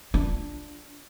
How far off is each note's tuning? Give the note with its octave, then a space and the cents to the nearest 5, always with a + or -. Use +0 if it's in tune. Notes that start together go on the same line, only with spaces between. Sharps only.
D4 +0 F4 +0